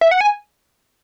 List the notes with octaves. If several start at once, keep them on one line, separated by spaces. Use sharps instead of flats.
E5
F#5
G#5